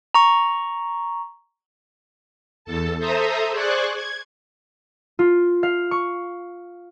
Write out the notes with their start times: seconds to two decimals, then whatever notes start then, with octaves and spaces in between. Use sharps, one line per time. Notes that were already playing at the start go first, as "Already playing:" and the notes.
0.14 A#5 C#6
2.65 E2 A4 A5
2.98 A4 C5 E5 A#5 D#6
3.50 G#4 C5 D5 G#5 C#6 F#6
3.94 G#6
5.19 F4
5.63 F5
5.91 C#6